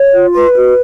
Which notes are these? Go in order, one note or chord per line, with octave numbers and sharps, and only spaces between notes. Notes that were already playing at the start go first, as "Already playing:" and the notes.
Already playing: C#5
F4
B4 C6
F#4